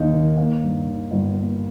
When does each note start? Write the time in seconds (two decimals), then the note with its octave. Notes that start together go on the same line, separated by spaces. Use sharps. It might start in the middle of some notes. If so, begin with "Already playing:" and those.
Already playing: D#2 D#3 A#3 D#4
0.14 D#3
0.38 A#3
0.62 G2
0.87 D#3
1.11 G1
1.35 A#3